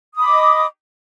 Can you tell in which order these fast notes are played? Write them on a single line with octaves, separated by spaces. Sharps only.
D#6 B5 D6 D#5